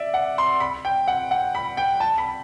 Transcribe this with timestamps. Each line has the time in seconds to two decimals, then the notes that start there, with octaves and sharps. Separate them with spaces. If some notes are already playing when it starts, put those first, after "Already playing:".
Already playing: D5 E5
0.14 F#5
0.38 C6
0.60 B5
0.85 G5
1.08 F#5
1.31 F#5
1.55 B5
1.77 G5
2.00 A5
2.18 B5